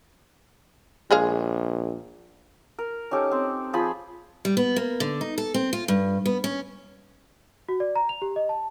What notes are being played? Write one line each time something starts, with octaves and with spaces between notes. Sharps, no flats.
A#1 G#3 G#4 F5
A#4
C#4 D#4 G4 A4
C4
F3 G#4 B5
G3
B3
A#3
D3
D#4
A4
C4
F4
G2
B3
C#4
F#4
D5
A#5
F7
G4
D#5
A5